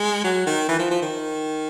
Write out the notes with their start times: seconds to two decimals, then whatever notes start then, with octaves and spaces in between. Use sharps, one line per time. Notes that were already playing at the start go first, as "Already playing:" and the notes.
Already playing: G#3
0.24 F#3
0.46 D#3
0.69 E3
0.79 F3
0.91 F3
1.02 D#3